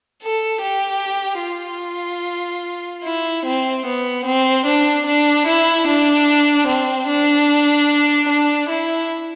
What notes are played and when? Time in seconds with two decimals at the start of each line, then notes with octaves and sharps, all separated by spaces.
0.23 A4
0.63 G4
1.44 F4
3.04 E4
3.46 C4
3.86 B3
4.26 C4
4.66 D4
5.06 D4
5.47 E4
5.87 D4
6.67 C4
7.08 D4
8.29 D4
8.69 E4